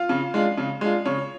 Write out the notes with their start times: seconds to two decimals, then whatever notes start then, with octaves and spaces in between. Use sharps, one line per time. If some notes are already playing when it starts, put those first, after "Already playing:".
Already playing: F4 F5
0.09 C#3
0.34 G#3 D4 F4
0.58 C#3
0.81 G#3 D4 F4
1.05 C#3 C#5